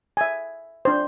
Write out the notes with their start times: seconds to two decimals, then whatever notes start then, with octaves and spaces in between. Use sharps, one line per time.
0.17 E5 G#5
0.85 D4 C5